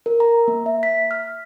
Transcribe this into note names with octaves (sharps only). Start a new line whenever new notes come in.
A#4
A#5
A#3
E5
B6
F6